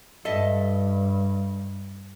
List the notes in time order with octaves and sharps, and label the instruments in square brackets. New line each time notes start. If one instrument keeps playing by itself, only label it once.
[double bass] G2 [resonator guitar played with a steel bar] A4 D#5 E5